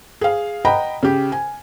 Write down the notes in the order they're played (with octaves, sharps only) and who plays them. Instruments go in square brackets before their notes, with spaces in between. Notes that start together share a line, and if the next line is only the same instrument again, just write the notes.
[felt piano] G#4 F5
D#5 F#5 G5 A#5 B5
C#3 G4
G#5